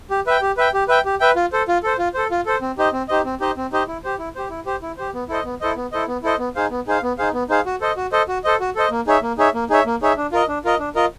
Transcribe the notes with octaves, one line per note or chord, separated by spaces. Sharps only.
G4
B4 E5 G5
G4
B4 E5 G5
G4
B4 E5 G5
G4
B4 E5 G5
F4
A4 C5
F4
A4 C5
F4
A4 C5
F4
A4 C5
C4
D#4 G4 C5 D#5
C4
D#4 G4 C5 D#5
C4
D#4 G4 C5 D#5
C4
D#4 G4 C5 D#5
E4
G4 C5
E4
G4 C5
E4
G4 C5
E4
G4 C5
B3
E4 A4 C5 D#5
B3
E4 A4 C5 D#5
B3
E4 A4 C5 D#5
B3
E4 A4 C5 D#5
B3
D#4 G#4 C5 F5
B3
D#4 G#4 C5 F5
B3
D#4 G#4 C5 F5
B3
D#4 G#4 C5 F5
F#4
A4 C5 D#5
F#4
A4 C5 D#5
F#4
A4 C5 D#5
F#4
A4 C5 D#5
A#3
D#4 G#4 C#5 E5
A#3
D#4 G#4 C#5 E5
A#3
D#4 G#4 C#5 E5
A#3
D#4 G#4 C#5 E5
D4
F4 A#4 D#5
D4
F4 A#4 D#5
D4
F4 A#4 D#5